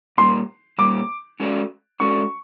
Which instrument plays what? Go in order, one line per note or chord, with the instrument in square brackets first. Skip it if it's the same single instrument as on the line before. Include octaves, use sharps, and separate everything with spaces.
[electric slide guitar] A#2 G3 A#3 [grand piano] C6
[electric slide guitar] A#2 G3 A#3 [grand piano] D6
[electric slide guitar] G#3 C#4 F#4 A4 D5
[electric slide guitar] G#3 C#4 F#4 A4 D5 [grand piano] C#6